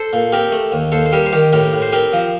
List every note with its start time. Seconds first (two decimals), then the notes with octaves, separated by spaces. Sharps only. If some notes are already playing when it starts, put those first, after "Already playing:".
Already playing: A4 C5
0.13 A#2
0.33 C4 G4 A#4
0.52 A3
0.72 D#2
0.92 D#2 A4 C5
1.06 C5
1.13 G3 G4 A#4
1.26 C5
1.32 D#3 G4 A#4
1.53 A2 G4 A#4
1.73 A2
1.82 C5
1.92 C4 G4 A#4
2.13 F3